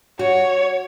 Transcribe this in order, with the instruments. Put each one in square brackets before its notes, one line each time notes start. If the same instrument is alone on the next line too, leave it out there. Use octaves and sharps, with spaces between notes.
[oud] F#4 [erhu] C#5